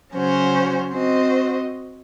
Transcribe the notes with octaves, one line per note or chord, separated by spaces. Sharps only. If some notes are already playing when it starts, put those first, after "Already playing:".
C#3 F#3 C#4 F#4 C5
C4 F#4 C5 D#5